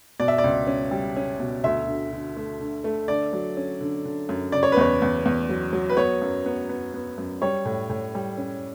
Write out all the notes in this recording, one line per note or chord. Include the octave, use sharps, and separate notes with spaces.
B2 D5
E5
D5
C#2
C#4
G3
C#4
B2
D2 E5
D3
D3
A3
D3
A3
D3 D5
F#3
C#4
D3
D3
F#2
C#3 D5
C#5
B4
E2 C#5
E2
E2
F#3
F#3
B4
B3 C#5
F#2
B3
B3
B3
F#2
G3 C#5
A2
A2
G3
C#4